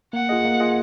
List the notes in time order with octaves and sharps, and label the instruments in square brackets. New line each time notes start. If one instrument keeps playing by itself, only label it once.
[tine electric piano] A#3 [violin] F#5
[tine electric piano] F4 G#4 D#5
A#3
F4 G#4 D#5